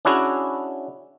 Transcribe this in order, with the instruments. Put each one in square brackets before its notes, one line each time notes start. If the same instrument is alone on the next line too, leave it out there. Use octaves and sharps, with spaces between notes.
[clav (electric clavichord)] C#4 D4 E4 F#4 G#4